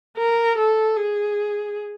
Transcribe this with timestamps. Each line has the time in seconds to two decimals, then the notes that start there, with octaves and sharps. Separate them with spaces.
0.18 A#4
0.57 A4
0.96 G#4